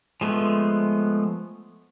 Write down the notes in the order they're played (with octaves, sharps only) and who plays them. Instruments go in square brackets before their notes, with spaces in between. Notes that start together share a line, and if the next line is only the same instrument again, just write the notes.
[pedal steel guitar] F3 G#3 A3 B3